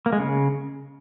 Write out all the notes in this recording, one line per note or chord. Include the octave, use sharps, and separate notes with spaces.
A#3
G#3
C#3